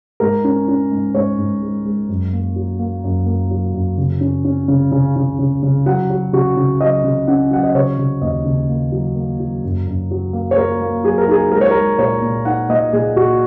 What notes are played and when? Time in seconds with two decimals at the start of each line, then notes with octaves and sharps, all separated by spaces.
0.20 G#2 A#4
0.44 C#4
0.68 C#4
0.91 G#2
1.15 G#2 C#5
1.38 G#2
1.62 G#3
1.85 G#3
2.09 F#2
2.32 A#3
2.56 F#3
2.79 A#3
3.04 F#2
3.26 A#3
3.51 F#3
3.74 F#2
3.97 C#3
4.21 C#4
4.45 C#4
4.68 C#3
4.92 C#3
5.16 C#3
5.39 C#3
5.63 C#3
5.86 F#3 F#5
6.10 F#3
6.33 C#3 F#4
6.57 C#3
6.80 F#3 D#5
7.04 C#3
7.27 C#4 F#5
7.51 F#3 F#5
7.63 D#5
7.75 C#3 C#5
7.98 C#3
8.21 D#2 D#5
8.45 C#3
8.69 A#3
8.92 F#3
9.16 A#3
9.40 F#3
9.64 F#2
9.87 F#2
10.11 F#3
10.33 A#3
10.51 C#5
10.57 A#3 A#4
10.81 A#3
11.04 F#3 G#4
11.18 A#4
11.28 D#4 G#4
11.52 G#3 A#4
11.61 C#5
11.71 G#3 A#4
11.98 A#2 C#5
12.23 A#2
12.45 D#4 F#5
12.69 A#2 D#5
12.93 A#2 G#4
13.16 A#2 F#4